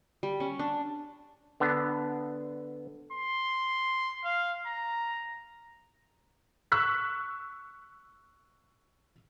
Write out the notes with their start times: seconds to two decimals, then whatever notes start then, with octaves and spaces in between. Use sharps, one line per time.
0.23 G3
0.40 C#4
0.59 D4
1.60 D3 B3 D4
3.12 C6
4.25 F5
4.66 A#5
6.72 C#6 E6 F#6 B6